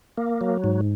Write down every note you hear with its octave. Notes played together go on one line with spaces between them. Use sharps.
A#3
F#3
G#2